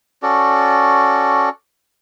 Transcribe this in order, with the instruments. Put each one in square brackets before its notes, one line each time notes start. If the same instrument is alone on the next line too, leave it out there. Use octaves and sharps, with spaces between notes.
[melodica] C#4 F#4 A4 D5